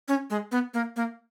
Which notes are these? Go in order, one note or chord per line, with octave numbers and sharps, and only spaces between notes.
C#4
G#3
B3
A#3
A#3